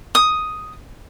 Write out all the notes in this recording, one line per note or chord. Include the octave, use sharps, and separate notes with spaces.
D#6